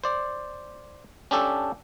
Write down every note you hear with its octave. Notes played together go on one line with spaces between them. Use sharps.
C5 D5
C#4 D4 G4 A4